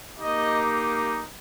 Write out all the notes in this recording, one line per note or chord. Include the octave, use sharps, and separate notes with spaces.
A#3 D#4 G4 D#5